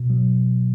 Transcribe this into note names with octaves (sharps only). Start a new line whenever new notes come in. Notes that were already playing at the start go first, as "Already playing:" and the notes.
Already playing: B2
F#3